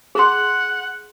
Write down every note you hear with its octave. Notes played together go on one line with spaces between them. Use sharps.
G#4 F#5 C6